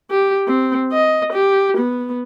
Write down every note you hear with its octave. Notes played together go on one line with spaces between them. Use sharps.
G4
C4
D#5
G4
B3